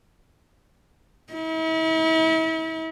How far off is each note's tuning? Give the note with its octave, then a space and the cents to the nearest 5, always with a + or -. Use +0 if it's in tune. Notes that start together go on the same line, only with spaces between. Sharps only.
E4 -40